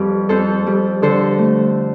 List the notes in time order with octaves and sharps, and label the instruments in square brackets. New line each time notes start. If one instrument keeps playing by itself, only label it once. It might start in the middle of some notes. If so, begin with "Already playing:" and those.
Already playing: [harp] F2 G3 G4 B4
F2 A4 C5
G3
D3 A4 C5
A3